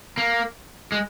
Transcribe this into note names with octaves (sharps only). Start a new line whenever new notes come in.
A#3
G#3